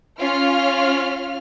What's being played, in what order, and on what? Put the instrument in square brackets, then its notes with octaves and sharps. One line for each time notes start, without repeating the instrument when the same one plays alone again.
[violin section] C#4 F4 F6